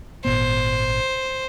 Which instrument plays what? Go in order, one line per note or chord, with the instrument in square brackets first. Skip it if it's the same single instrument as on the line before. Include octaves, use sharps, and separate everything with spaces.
[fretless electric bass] G#1 A#2 B3 [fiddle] C5